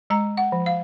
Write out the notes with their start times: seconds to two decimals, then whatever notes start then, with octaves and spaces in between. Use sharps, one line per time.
0.10 G#3 A#5
0.37 F#5
0.52 F3
0.66 F5